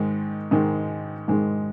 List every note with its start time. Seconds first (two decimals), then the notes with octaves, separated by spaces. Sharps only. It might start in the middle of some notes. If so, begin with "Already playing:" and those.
Already playing: G#2 D#3 G#3
0.51 G#2 D#3 G#3
1.28 G#2 D#3 G#3